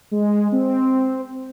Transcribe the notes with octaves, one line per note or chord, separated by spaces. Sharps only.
G#3
C4